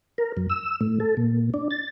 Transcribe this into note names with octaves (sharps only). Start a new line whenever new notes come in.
A#4
F#2
E6
A2
A4
A#2
D4
A6